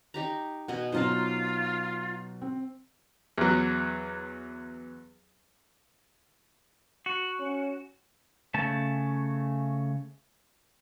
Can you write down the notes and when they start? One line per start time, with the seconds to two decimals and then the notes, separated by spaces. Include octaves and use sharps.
0.14 D#4 G4 A#5
0.68 B2 D#5 F#5 G#5
0.92 B2 F#3 D#4 F4 C5 D#5 A5
2.41 C4
3.38 E2 F#3
7.06 F#4
7.39 C#4
8.54 C#3 A3 A5